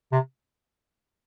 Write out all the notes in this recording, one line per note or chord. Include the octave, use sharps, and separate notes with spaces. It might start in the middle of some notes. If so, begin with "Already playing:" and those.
C3